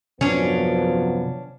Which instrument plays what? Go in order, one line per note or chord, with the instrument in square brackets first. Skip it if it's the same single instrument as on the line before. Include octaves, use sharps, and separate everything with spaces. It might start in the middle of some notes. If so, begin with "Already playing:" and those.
[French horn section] F#2 B3 [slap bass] C3 D#3 F#3 [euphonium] F3 [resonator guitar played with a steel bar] C#4 D4